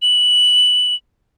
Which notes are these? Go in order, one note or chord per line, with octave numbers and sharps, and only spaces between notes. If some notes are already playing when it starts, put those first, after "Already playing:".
F#7